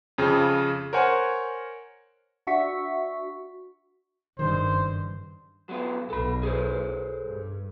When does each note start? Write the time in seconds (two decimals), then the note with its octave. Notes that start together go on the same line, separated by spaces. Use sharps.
0.18 F2 C#3 F3
0.93 A#4 C5 C#5 F#5 G#5
2.47 D4 F#4 E5 C#6 B6
4.39 F#1 G2 D#3 C5
5.69 F#3 B3 F4
6.10 B1 A4 B5
6.43 G#4 A4 C5
7.22 G2